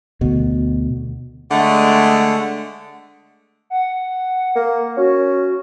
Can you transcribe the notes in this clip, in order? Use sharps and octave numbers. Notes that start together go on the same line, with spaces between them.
D2 B2
D3 G#3 A3 F#5
F#5
A#3
C#4 F#4